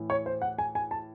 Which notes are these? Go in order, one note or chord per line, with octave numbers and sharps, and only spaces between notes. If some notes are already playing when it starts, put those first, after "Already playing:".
Already playing: A2 E3
C#5
C5
F#5
G#5
G#5
A5